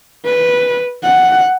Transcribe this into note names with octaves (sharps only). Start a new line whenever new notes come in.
B4
F#5